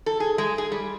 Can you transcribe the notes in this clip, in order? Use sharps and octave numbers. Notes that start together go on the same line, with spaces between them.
A4
G#4
G#3
G#4
G3